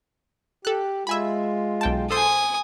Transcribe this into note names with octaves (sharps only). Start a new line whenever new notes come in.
G4 A4 F#6
G#3 F4 E5 G#5 B5
B1 G5 A5
A4 C5 G#5 D#6